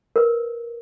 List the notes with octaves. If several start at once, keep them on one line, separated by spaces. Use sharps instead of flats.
A#4 B4